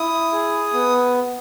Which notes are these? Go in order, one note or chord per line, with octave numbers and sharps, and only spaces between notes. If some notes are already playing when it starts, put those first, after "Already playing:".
Already playing: E4 D#6
G#4
B3